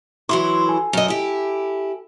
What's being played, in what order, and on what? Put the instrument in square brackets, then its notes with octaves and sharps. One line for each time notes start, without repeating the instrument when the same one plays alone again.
[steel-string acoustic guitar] E3 F#3 E4 [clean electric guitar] E5 C6
[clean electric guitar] A4 G#5
[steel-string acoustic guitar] F#2 D#5
E4 G4